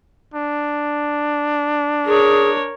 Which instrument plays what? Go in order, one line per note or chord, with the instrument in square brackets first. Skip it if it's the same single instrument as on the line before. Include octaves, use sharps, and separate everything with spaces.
[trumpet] D4
[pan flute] G#4 [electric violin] A#4 C#5